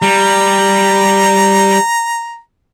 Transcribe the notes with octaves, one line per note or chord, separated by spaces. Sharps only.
G3 A#5